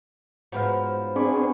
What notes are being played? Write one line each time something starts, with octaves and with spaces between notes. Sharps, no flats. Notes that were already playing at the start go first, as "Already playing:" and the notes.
G#2 F3 F#3 B3 F5
C4 D4 G#4 B5 C#6 D6